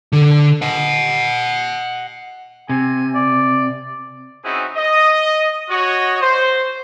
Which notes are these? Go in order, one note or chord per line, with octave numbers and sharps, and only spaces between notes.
D3
D#5 F#5
C3 G#5
D5
C4 C#4 D#4 E4 F#4 G#4
D#5
F#4 C#5 D#5
C5